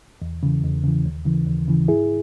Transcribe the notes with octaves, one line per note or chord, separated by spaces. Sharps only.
E2
C#3 E3
E2
C#3 E3
D#2
C#3 E3
D#2
C#3 E3
G#2 E4 G#4